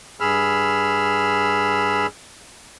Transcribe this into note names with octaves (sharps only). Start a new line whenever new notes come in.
G2 G#4 B5 E6 F6